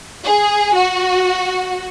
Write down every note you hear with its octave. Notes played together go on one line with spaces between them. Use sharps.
G#4
F#4